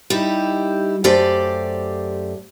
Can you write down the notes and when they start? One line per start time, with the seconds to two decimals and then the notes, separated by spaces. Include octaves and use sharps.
0.10 G3 D#4 E4 G4
1.04 F#2 A3 G4 C5 D5